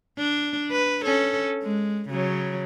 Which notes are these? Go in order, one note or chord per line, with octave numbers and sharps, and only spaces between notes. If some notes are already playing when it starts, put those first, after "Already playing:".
D4
B4
C#4 A4
G#3
C#3 F#3